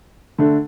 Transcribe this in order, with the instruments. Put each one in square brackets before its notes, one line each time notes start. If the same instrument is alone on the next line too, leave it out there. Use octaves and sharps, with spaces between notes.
[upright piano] D3 A3 D4